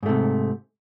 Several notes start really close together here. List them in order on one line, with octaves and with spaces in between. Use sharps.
G#2 A3 C3